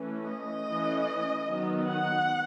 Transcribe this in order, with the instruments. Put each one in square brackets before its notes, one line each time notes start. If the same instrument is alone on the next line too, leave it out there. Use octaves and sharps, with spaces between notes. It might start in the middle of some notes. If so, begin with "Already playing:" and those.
Already playing: [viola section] E3 A3 C#4
D#5
E3 A3 C#4
D#3 F#3 B3
F#5